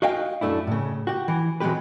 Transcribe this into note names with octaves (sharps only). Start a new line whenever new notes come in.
F#4 D#5 F5 G5 G#5
F#2 A3 D4 E4
A2 C#3
F#4 G4
E3
E3 F#3 G#3 C4 G4 B4